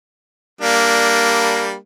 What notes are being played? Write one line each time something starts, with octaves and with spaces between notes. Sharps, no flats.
G3 A#3 D4